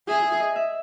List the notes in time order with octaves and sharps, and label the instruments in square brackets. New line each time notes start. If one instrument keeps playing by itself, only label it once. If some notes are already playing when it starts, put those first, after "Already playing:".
[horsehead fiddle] G#4 [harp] E5
[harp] D#5
E5